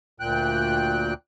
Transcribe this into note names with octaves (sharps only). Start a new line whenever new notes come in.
D2 A#2 G5 F#6